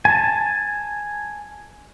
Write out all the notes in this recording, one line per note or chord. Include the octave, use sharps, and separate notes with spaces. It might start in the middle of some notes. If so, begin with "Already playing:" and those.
G#5 A5